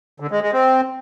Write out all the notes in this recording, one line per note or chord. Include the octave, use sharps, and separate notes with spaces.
D3
G#3
G#3
C4